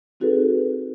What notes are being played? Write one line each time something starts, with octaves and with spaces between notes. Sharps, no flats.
C4 D#4 F#4 G#4 A4 B4